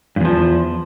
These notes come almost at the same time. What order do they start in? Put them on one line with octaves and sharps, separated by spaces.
G2 E2 F3